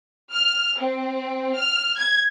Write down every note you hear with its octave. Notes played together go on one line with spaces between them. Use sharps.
F6
C4
F6
G#6